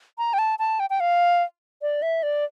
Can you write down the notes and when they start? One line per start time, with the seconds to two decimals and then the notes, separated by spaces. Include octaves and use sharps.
0.18 A#5
0.34 G5
0.39 A5
0.59 A5
0.80 G5
0.90 G5
1.00 F5
1.82 D5
2.02 E5
2.23 D5